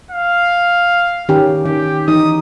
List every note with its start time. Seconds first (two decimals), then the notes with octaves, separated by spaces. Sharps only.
0.11 F5
1.29 D#3 C#4 G4
1.66 D#3 G4
2.08 E3 D#4 D#6